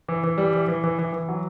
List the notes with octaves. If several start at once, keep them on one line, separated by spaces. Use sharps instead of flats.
E3
E3
G3
E3
E3
E3
E3
E3
F#3